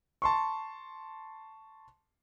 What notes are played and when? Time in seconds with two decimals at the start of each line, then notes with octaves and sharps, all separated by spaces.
0.22 A5 C6 C#6